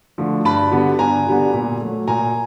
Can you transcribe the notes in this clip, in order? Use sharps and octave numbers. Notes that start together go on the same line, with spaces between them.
D3 F3 A3
G2 A5 B5
D3 G3 B3
G2 G#5 A#5
D3 G3 B3
A#2
F#3 A3
A#2 G#5 A#5